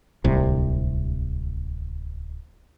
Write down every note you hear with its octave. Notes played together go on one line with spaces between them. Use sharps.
D1 C2 C3